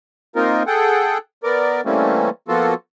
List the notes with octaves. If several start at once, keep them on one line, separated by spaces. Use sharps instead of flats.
A#3 C4 D#4 F4 A#4
G#4 A4 F#5 G5
B3 A#4 D5
E3 G3 A3 A#3 C4 C#4
F3 A#3 B3 F4 F#4 A4